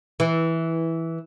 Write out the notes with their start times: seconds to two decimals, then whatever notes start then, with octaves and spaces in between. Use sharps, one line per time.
0.20 E3